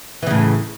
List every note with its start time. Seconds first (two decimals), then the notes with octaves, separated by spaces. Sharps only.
0.23 E3
0.27 C#3
0.30 A2